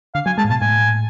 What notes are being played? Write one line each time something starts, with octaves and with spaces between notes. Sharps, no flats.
D3 F5
F#3 G#5
G#3 A5
A2
B2 A5
A2 G#5